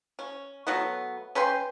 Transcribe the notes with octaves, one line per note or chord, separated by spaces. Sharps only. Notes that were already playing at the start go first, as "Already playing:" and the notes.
C#4
B2 F#3 A3 B3
C#4 B4 G5 C6